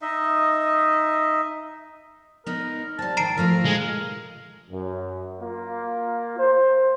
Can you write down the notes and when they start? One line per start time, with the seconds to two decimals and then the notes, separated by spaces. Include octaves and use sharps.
0.02 D#4 D#5 E5
2.46 B3 D#4 A#4
2.99 G3 C4 A5
3.17 G#2 D#3 A#5 C7 D7
3.37 F3 A3 F4 A#4
3.65 G#3
4.71 F#2
5.40 A#3 F4
6.39 C5